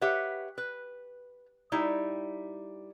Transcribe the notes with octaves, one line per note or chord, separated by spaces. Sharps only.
G4 B4 C#5 E5 F#5
B4
G3 D#4 E4